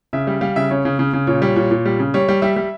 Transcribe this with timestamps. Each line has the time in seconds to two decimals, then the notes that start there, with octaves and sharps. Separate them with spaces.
0.13 C#3 E5
0.27 G3
0.41 G3 F5
0.56 C#3 E5
0.71 C#3 C#5
0.85 C#3
0.99 C#3
1.13 C#3
1.27 A#2 C#5
1.42 G3 C#5
1.56 A#2 C#5
1.71 A#2
1.86 G3
1.99 C#3
2.14 G3 C#5
2.29 G3
2.42 G3 E5
2.56 G3